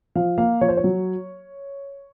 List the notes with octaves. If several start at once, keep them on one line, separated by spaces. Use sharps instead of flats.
F3 F5
A#3 F5
F3 C#5
C5
C#5
F#3